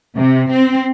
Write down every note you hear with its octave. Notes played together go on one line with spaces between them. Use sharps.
C3
C4